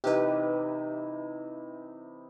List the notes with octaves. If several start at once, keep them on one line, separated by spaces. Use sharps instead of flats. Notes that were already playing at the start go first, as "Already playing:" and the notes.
C3 E3 D#4 G4 B4